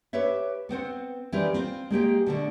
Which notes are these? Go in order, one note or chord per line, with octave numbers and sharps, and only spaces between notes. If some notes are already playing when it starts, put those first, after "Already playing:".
G4 B4 C#5 E5
B3 C4 C5 F#5
E3 G3 C4 D#4 G4 A#4
C4 F4
G#3 A#3 G4 G5
B2 D3 A3